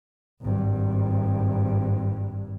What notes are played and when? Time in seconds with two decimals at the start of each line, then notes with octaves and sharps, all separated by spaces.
0.42 G#1 G2